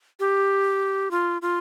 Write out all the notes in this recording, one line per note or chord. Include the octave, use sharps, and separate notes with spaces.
G4
F4
F4